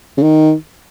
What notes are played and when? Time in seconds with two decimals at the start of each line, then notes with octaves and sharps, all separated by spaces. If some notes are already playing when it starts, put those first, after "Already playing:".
0.17 C#3
0.23 D#3